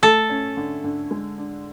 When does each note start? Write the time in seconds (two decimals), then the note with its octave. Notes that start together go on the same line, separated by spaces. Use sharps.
0.02 A3 A4
0.30 C#4
0.57 D3
0.84 D3
1.11 G#3
1.38 D4